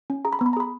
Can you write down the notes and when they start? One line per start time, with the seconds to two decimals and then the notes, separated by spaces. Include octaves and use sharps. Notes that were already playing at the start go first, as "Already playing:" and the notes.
0.10 C#4
0.25 G#4 A#5
0.33 B5
0.39 B3 A#5
0.46 B5
0.53 A#5
0.57 G#4 B5